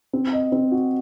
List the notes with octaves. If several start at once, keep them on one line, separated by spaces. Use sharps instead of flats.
C4
D#5
C4
F#4